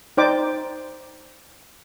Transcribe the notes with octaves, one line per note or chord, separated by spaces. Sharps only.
D#4 C5 D5 G5 D6